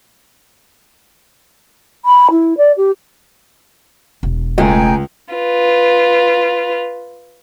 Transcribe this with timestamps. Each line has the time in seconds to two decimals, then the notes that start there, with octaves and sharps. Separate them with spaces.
2.05 B5
2.31 E4
2.57 D5
2.77 G4
4.23 E1
4.58 C#2 G#3 A3 G5 G#5 A#5
5.34 F4 B4